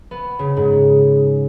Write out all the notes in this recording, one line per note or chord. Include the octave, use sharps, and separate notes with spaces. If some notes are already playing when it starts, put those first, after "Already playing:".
B3
C#3
G#2